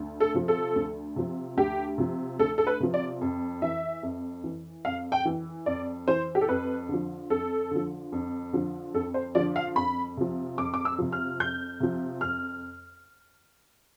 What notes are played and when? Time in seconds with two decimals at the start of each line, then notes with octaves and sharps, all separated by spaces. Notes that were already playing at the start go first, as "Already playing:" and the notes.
Already playing: D2
0.20 A4
0.34 C3 F3
0.48 A4
0.76 D2
1.16 C3 F3
1.57 D2 G4
1.98 C3 F3
2.39 D2 A4
2.58 A4
2.67 B4
2.80 C3 F3
2.94 D5
3.21 F2
3.62 E3 E5
4.03 F2
4.44 E3
4.85 F2 F5
5.12 G5
5.25 E3
5.66 F2 D5
6.08 E3 C5
6.35 G4
6.41 A4
6.49 F2 B4
6.89 D3 F3
7.30 F2 A4
7.71 D3 F3
8.12 F2
8.53 D3 F3
8.94 F2 A4
9.14 C5
9.35 D3 F3 D5
9.56 F5
9.76 F2 B5
10.17 C3 F3
10.58 F2 D6
10.74 D6
10.85 E6
10.99 C3 F3
11.12 F6
11.40 F2 G6
11.80 C3 F3
12.21 F2 F6